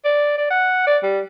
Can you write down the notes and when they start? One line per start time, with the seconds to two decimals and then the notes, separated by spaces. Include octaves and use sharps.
0.04 D5
0.38 D5
0.50 F#5
0.87 D5
1.02 G3